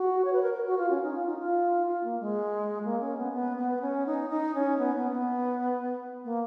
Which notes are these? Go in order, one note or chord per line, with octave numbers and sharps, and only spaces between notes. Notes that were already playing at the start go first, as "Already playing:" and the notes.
Already playing: F#4
C#5
B4
A#4
A#4
F#4
F4
C#4
D#4
F4
D#4
F4
F4
A#3
G#3
A#3
C#4
B3
B3
B3
C#4
D#4
D#4
C#4
B3
B3
B3
A#3